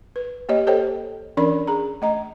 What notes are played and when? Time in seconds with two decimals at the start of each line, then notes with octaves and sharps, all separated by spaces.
0.16 B4
0.49 A#3 G4 C#5 D#5
0.67 G4 A4 C5 C#5 D#5 G5
1.37 E3 C#4 D4 A#4 D5 B5
1.67 G#4 A#5
2.02 A3 D#5 A#5